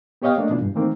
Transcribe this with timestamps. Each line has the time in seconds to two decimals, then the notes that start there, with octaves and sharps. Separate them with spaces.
0.22 B3 G4 C#5 D#5 F5 G5
0.38 A3 A#3 D4 D#5
0.49 B2 E3 B3 D4 E4 F4
0.61 G2
0.74 D#3 E3 A3 A#3 C4 D#4